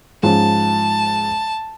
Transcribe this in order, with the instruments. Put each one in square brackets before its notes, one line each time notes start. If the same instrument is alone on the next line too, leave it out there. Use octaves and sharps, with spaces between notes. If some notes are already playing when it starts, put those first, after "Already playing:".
[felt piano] G#2 F3 C#4 [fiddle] A5